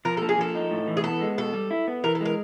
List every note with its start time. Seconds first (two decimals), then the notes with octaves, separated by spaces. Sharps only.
0.05 F3 A#4
0.17 A#3 A4
0.29 G#4
0.38 F3 A4
0.55 D#4
0.71 A2
0.88 E3
0.97 G#4
1.04 B3 A4
1.21 G#3
1.38 B2 A4
1.54 G3
1.71 E4
1.88 B3
2.04 E3 A#4
2.15 A4
2.21 G#3 A#4